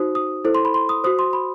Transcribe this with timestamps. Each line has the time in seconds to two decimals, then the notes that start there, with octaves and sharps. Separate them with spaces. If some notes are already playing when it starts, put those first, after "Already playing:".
Already playing: D#4 F#4 C5 D#6
0.15 D#6
0.45 E4 A4 C5
0.55 C6
0.65 B5
0.74 C6
0.89 D#6
1.04 F#4 C5 D#6
1.19 C6
1.33 B5